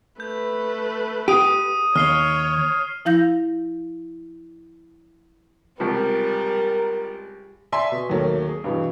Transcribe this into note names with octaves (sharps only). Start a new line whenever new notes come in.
A3 B4 G6
G4 D#6 D#7
D#2 C#5 F6 C7 G7
F3 E4 F5 G6 A#6
C#2 C3 F3 G3 A#4
D5 E5 G#5 C6 B6
B2
D#2 F#3 A3 A#3
G#4
G2 B2 E3